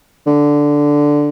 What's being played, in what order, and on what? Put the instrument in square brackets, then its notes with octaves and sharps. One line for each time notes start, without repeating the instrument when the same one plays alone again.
[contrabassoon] D3